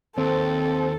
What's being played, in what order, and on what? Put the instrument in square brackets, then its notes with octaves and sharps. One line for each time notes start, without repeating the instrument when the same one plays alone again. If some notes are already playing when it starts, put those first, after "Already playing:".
[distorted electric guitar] D#2 [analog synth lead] C4 [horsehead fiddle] A4